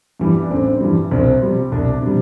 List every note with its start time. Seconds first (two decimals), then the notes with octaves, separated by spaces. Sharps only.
0.20 G2 E3 G3
0.42 D4
0.50 A1 C4
0.81 G2 E3 G3
1.11 C2 C4
1.42 C3 G3
1.72 C2 D4
2.02 C3 G3